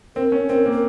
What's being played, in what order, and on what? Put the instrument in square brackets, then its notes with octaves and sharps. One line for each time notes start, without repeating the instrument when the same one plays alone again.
[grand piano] C4 [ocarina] A#4
[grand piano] C#4
[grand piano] C4 [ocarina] A#4
[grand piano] A#3
[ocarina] A#4